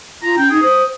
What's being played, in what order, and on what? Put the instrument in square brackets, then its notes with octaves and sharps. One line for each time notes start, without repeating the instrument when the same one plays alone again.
[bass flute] F4 [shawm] A#5
[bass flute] C#4 [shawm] G5
[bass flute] D#4 [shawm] G#4
[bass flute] C5 [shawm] D#6